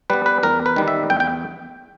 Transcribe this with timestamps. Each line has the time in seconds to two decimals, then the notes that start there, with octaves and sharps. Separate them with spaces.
0.10 G3 B3 B4
0.26 B4
0.43 E2 A#4
0.66 B4
0.76 D#3 G3
0.88 E5
1.10 E2 G5
1.20 G5